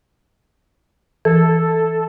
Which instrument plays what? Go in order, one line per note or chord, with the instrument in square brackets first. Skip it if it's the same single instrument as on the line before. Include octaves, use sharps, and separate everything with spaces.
[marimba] E3 [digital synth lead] A4